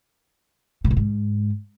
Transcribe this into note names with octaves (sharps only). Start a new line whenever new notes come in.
B2
A#2
G#2